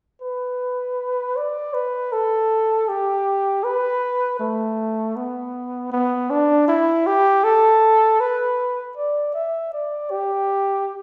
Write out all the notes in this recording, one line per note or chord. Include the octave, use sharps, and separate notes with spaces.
B4
D5
B4
A4
G4
B4
A3
B3
B3
D4
E4
G4
A4
B4
D5
E5
D5
G4